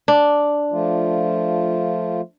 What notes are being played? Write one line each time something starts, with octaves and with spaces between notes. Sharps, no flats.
D4
F3 A3 F4